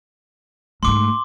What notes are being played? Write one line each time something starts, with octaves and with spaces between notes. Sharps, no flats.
G#2 A3 C6 D6